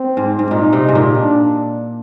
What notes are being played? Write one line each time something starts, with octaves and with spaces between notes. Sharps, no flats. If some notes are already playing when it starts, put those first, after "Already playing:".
Already playing: C4
G#2
G#2
A#2 D#4
C3
G#2
A#2
D4